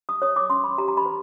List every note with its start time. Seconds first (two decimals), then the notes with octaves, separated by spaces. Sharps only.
0.09 D#6
0.22 C#5 D#6
0.36 D6
0.50 C#4 C6
0.64 B5
0.78 G4 A#5
0.88 A#5
0.97 B5
1.06 B4